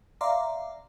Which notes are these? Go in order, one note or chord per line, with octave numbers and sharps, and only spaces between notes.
D5 E5 F5 A#5 C6 D6